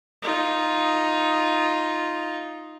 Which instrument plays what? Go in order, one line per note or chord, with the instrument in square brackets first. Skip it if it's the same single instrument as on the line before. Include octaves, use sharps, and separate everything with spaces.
[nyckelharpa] D#4 F4